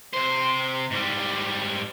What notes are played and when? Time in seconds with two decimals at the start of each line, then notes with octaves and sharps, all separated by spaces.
0.14 C3 C5
0.91 G#2 G3